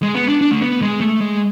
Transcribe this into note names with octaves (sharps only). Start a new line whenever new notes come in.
G#3
B3
D4
D4
A3
B3
G#3
A3
G#3